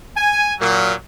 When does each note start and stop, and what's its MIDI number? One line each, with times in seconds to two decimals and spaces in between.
0.17 0.52 80
0.60 0.93 46
0.60 0.93 54